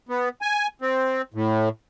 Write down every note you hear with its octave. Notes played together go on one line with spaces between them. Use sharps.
B3
G#5
C4
A2